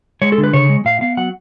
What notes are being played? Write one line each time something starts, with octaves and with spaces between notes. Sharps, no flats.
G#3 C#5
A4
D3
B4
C#3 C#5
G#3
A2 F5
B3 F5
F#3 F#5